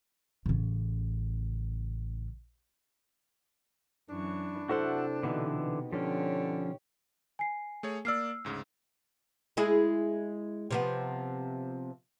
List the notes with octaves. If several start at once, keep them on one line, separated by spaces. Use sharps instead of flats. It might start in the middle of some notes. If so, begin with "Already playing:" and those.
A1 C#3
F#2 E3 D4 C#6
C3 E4 F#4 A4 C5 E5 F#5
B2 D3 E3 B3 D#4
D3 F3 C#4 G4 C#5
G#5 C7
A3 G#4 C#5
A#3 D5 E6 F6 C7
D2 G#2 C#3
G#3 E4 G#4
C3 F3 B3